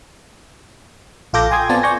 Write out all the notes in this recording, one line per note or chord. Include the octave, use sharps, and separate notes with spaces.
A#1 F4 A4 D6 G6 A#6
G5 G#5 C6 D#6 G#6
B3 C4 F4 D5 G#5 A5
D5 G#5 C#6 G6 A#6